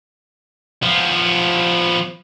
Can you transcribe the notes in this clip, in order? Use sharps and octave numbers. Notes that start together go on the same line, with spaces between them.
F3 B3